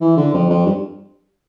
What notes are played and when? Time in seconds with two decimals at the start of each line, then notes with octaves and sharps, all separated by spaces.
0.01 E3
0.17 D3
0.33 F2
0.49 F2
0.66 G2